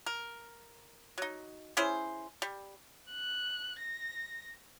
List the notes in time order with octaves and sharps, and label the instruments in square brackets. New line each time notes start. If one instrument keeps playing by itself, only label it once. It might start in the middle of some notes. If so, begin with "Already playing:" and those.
[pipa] A#4
F#3 D#4
C#4 E4 G#4 C5
G3
[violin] F#6
A#6